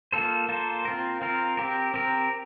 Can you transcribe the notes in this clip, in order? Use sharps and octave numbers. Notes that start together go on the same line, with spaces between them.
A#3 F4 A4 C5
A#3 F4 A4 C5
C4 F4 A#4
C4 F4 A#4
C4 G4 A#4
C4 G4 A#4